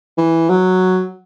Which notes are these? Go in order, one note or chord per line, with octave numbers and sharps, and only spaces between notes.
E3
F#3